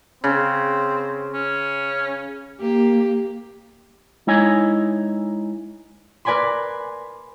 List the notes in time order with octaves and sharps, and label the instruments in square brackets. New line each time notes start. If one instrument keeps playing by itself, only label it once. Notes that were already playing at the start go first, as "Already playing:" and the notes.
[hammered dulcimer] C#3 [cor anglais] C4
[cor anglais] C#4
[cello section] A#3 [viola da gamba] G4
[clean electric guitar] G#3 D#4 E4 C#5 D#5 G#5
[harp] A#4 B4 D5 G#5 B5 C6